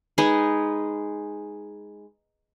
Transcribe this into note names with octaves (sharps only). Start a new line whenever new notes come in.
G#3 D#4 B4 G#5